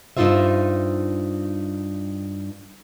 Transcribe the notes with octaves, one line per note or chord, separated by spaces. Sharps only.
G2 D3 D#4 F4 C5 E5